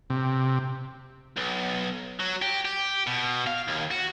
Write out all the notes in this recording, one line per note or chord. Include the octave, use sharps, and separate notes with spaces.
C3
B1
F#3
G4
G4
B2
F5
D#2
F#4